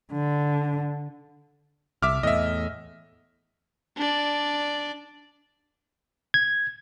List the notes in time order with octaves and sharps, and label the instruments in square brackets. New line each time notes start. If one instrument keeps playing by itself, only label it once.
[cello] D3
[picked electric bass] C2 [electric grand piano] E5 D6 F6
[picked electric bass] E2 A2 [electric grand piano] D#5 E5
[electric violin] D4 D5
[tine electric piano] G#6